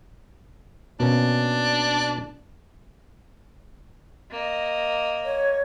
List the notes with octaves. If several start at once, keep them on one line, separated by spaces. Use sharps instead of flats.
B2 A#3 C#4 D4
A#3 D#5
C#5